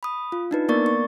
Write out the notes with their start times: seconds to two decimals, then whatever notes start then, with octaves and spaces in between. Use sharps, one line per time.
0.03 B5 D#6
0.32 F4
0.51 D4 D#4 B4
0.69 A#3 B3 A#4 D5 C#6 A6
0.86 C#6